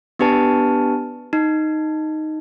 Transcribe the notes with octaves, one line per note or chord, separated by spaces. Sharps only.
B3 D4 G4 B4 A5
D#4